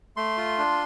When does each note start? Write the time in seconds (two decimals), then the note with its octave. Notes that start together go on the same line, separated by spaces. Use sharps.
0.17 A3 C6
0.37 F4
0.58 D4